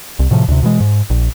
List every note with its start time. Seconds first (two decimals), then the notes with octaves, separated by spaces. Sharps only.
0.19 C2
0.31 A2 C3 F3
0.48 D2 C3
0.63 B2 E3 G#3
0.80 G#2
1.10 A#1